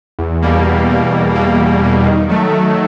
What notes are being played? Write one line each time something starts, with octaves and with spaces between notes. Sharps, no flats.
E2
B2 G3 A#3
E2
B2 G3 A#3
E2
B2 G3 A#3
E2
B2 G3 A#3
D#3
F#3 A3
D#3